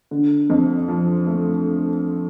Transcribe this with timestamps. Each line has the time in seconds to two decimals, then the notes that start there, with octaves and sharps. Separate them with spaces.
0.11 D3
0.50 F2
0.88 F3
1.27 A3